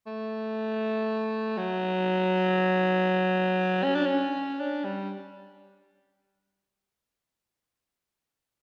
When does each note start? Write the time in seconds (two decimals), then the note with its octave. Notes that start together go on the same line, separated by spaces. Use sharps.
0.07 A3
1.58 F#3
3.84 C#4
3.95 D4
4.06 C#4
4.60 D4
4.85 G3